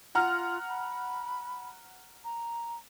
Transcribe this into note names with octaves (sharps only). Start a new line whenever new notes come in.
F4 F#5 A#5 F6
B5
A#5